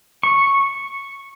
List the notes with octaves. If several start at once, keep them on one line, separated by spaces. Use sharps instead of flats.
C#6